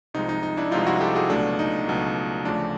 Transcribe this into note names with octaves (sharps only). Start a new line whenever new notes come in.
C2 C3 F3 G#3 D#4
D#4
D#4
D4 E4
C2 C3 F3 G#3 D#4 F4
E4 F#4
G4 A4
F#4 G#4
C#2 B2 F#3 A3 D4
D#4
C#2 B2 F#3 A3
D2 C#3 F3 A3 D4